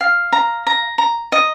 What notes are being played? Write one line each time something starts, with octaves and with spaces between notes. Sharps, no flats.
F5
A#5
A#5
A#5
D#5